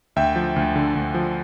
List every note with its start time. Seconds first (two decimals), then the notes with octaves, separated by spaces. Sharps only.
0.16 D2 E5 G5
0.36 F3
0.56 D2
0.76 D3
0.95 D2
1.14 F3